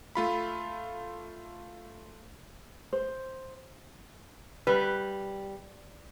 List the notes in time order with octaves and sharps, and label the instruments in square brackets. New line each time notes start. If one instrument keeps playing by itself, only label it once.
[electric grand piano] A3 F4 B5
[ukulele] C5
[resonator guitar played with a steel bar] G3 [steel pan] B4